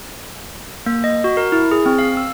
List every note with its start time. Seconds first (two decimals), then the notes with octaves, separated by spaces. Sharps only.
0.86 A#3
1.04 D#5
1.24 F#4
1.37 A#4
1.52 E4
1.71 G#4
1.86 C4
1.99 F5
2.17 E6